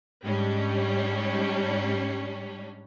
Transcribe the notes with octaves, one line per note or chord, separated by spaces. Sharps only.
G#2 G3 C#4 D4